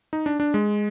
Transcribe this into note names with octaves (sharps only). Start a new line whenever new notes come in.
D#4
D4
D4
G#3